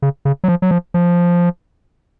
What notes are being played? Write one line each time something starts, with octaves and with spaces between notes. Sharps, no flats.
C#3
C#3
F#3
F3
F#3
F3
F3